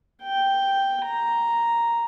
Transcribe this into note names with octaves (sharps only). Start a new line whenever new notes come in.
G5
A#5